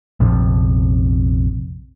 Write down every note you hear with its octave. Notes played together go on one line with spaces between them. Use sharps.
A#1 F2 C3